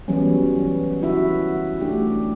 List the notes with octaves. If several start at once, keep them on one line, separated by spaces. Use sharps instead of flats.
E3 F#3 G3 B3 C#4
E4 F#4 E5
A3 D4 G4